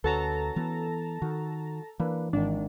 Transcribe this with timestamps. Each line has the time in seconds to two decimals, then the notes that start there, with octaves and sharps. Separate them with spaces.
0.04 D2 C#4 F#4 A4 B4 A5 A#5
0.56 E3 B3
1.22 D#3 F#4
2.00 E3 A#3 D4 B4
2.33 G#1 D#3 D4